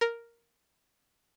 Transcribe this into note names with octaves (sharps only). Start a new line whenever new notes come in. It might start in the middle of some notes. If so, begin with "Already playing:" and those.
A#4